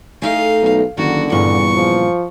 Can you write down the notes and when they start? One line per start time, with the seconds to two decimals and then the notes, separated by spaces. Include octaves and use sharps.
0.22 A3 D#4 G#4 F5
0.62 B1
0.98 F#1 D3 D#3 F#4
1.32 E2 G2 A#2 C#3 C#6
1.76 F3